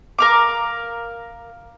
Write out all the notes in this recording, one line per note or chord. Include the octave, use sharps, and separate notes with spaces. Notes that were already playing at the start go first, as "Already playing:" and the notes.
A#4 F5 D6